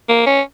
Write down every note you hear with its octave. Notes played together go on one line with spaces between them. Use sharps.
A#3
C#4